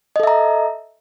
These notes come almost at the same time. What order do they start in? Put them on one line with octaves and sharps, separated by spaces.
D#5 A4 E5 A#5